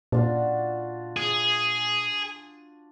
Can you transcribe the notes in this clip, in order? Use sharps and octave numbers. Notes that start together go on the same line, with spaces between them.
A#2 D4 F4 F#4
G#4